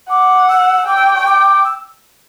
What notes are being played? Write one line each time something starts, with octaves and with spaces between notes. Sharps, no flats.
F#5 D6
E6
G5 D6
E6
D6
C#6
D6
E6